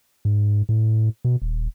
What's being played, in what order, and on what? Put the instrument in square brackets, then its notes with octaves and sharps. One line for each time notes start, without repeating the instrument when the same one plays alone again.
[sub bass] G#2
A2
B2
D#1